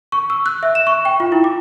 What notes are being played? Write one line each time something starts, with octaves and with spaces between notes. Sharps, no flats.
C#6
E6
F#6
E5
E7
C#6
G5
F4
E4
D6